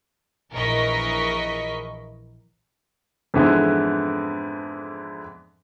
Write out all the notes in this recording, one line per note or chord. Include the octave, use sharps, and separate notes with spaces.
A#1 E3 A#4 D#5 C#6 B6
F2 G#2 D3 E3 G#3 B3